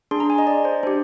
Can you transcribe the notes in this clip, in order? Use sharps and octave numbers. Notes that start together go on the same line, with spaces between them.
D4 G#4 C6
A#5
G#5
D#5
D5
C5
D4 G4 C5